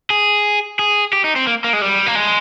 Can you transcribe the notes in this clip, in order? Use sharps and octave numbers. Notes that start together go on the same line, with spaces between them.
G#4
G#4
G4
D#4
C4
A#3
A#3
G#3
G3
A#3
G#3